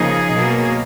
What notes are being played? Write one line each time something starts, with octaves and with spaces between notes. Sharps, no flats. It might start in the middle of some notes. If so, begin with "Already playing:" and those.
Already playing: C#3 F3 A#3 D#4 G#4
B2 F#3 A#3